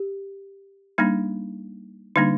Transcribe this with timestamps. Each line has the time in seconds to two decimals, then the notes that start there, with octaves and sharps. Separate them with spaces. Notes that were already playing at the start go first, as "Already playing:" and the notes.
Already playing: G4
0.98 G3 A#3 D4 D#4
2.16 D3 G3 A#3 D4 D#4